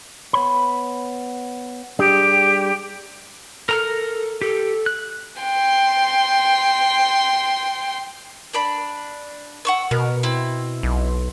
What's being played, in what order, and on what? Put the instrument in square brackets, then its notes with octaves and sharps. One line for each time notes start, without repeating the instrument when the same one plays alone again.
[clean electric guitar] B3 C#5 B5
[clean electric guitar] G3 D4 G#4 [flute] G4
[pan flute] A4 [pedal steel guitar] A#4 A#5 F6
[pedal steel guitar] G4 [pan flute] A4
[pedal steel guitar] F#6
[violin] G5 C6
[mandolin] D4 D5 B5
F#5 C#6 E6
[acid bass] B2 [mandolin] A#4
[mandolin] C4 E4
[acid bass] B1